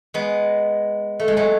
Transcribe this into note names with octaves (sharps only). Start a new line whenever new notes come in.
G#3 B3
A3
G#3
F#3 A3